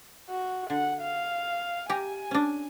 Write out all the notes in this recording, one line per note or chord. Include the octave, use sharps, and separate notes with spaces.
F#4
D3 F#5
F5
G4 G#5 A#5
C#4 D4